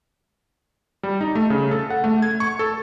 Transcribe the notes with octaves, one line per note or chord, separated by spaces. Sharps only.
G3
D#4
A3
C#3
A4
F#5
A3
G#6
C#6
A4